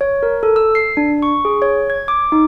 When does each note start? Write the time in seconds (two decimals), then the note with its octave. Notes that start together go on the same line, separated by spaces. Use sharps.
0.01 C#5
0.23 A#4
0.43 A4
0.56 E6
0.75 C7
0.97 D4
1.22 C#6
1.45 G#4
1.62 C#5
1.90 G#6
2.08 D6
2.32 D#4